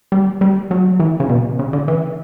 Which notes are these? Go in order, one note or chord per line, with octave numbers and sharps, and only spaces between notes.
G3
G3
F#3
E3
C#3
B2
C#3
D3
E3